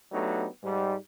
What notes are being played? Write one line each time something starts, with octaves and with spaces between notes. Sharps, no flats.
F#3 A3 B3 D4 D#4 G4
G#2 G3